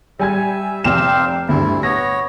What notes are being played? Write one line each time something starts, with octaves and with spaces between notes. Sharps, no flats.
G3 E5 G#5 G#6
F1 C4 G4 F5 G5 E7
D2 G2 E4
B3 C#5 A#6